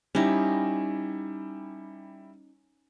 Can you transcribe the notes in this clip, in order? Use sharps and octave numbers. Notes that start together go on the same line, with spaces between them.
G3 C#4 D#4 E4 G4